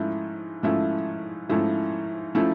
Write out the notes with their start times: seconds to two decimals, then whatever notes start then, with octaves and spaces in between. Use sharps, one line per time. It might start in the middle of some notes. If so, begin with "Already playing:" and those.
Already playing: G#2 F3 A3 C#4 E4
0.63 G#2 F3 A3 C#4 E4
1.49 G#2 F3 A3 C#4 E4
2.35 F3 A3 C#4 E4